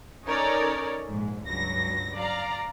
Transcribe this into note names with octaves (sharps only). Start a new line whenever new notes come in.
C#4 D#4 A4 A#4 C#5 D5
A#1 G#2
C#2 G2 F#3 A#6
D5 F5 A#5